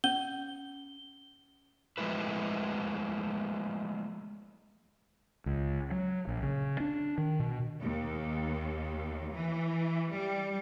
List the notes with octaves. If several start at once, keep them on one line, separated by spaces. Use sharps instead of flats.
C#4 G7
F3 G#3 A3 E4 B4
C#2
F#3
A#1
C#3
D4
D#3
B2
D#2
E3
G3